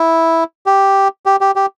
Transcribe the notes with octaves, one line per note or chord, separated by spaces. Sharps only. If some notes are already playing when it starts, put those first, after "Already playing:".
Already playing: E4
G4
G4
G4
G4